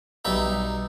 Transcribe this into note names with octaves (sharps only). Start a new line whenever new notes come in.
B1 G3 D#4 E5